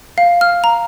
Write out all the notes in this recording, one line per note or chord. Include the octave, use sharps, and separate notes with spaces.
F5
F6
A#5